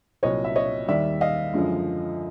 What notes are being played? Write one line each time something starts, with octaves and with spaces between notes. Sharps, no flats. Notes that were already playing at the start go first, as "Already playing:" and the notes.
C2 A#2 F#3 C#5 D#5
E5
C#5 D#5
D#2 D#3 G3 D5 E5
D#5 F5
F#2 D3 F3 G#3